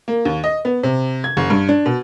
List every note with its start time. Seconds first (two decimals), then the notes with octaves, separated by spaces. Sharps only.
0.08 A#3
0.25 D#2
0.44 D#5
0.65 B3
0.83 C3
1.24 G#6
1.37 F#1
1.50 G2
1.69 D4
1.86 B2